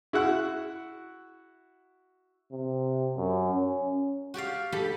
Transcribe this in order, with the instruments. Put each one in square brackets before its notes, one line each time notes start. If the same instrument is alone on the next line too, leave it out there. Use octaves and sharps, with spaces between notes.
[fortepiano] E4 F#4 F#5 F#6
[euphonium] C3
F#2
C#4
[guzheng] F#4 G4 D5 F5
G3 G4 A4 A5 B5